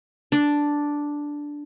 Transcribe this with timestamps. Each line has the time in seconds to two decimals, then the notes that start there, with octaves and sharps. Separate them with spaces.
0.32 D4